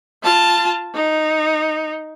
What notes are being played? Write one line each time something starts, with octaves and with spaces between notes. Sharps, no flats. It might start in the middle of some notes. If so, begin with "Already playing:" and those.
F4 A5
D#4